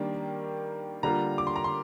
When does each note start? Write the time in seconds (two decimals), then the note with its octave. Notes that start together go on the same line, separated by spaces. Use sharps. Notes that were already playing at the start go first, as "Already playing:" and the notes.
Already playing: D#3 G3 A#3 D4
1.03 D3 G3 A#3 F4 A#5
1.38 D6
1.47 C6
1.56 A#5
1.64 C6